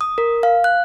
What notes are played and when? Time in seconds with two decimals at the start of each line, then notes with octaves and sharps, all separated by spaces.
0.01 D#6
0.18 A#4
0.43 F5
0.64 F#6